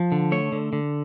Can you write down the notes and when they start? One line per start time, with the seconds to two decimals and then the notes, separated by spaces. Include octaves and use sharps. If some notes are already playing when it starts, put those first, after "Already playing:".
Already playing: F3
0.12 D3
0.32 A3 C#5
0.52 D3
0.73 D3